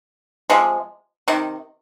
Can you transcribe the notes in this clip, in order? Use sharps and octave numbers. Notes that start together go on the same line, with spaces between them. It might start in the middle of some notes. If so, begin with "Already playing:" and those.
C3 F3 G#3
C3 D#3